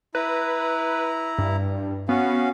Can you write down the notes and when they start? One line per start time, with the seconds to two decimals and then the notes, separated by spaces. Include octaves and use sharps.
0.15 E4 B4 A#5
1.38 G2
2.09 B3 C#4 F#4 F5